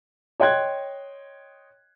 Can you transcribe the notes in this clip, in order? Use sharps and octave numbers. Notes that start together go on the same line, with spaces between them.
C#5 D#5 G5 C6 F#6 G#6